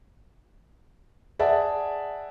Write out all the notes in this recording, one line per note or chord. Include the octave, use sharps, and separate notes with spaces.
G#4 D5 E5 F#5 A5